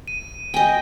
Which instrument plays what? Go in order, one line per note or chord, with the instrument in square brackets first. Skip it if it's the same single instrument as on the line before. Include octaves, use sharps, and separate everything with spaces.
[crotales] D#7
[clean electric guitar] C#3 G#3 G#5 [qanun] D#5 G5